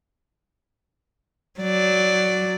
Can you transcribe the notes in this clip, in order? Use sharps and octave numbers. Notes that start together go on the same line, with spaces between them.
F#3 D5